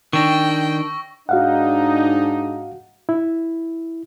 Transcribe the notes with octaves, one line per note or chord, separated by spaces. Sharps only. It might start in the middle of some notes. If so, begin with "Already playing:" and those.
D#3 D4 G5 C#6 E6 A#6
G#2 D4 D#4 F#4 F5 F#5
E4